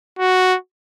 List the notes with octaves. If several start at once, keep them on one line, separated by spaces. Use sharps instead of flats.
F#4